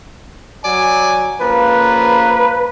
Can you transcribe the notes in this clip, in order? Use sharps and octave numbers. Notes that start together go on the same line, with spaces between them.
F#3 D5 G#5
C#3 F3 A#3 B4